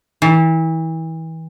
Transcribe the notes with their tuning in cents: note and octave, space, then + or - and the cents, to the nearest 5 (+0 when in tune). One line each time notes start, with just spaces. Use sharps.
E3 -30